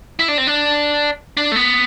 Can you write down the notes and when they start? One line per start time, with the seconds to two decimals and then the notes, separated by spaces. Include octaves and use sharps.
0.19 E4
0.28 D4
0.38 C4
0.47 D4
1.37 D4
1.52 A3
1.56 B3